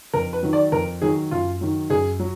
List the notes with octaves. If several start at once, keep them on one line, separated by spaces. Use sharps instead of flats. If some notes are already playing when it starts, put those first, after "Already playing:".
F2 A#4
B4
D#3 F#3
D5
F2 A#4
D#3 F#3 G#4
F#2 F4
D#3 F#3
F#2 G#4
F#3